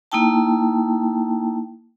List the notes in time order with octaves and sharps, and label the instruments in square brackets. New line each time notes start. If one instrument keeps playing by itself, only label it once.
[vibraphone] A#3 D#4 E4 G5 A5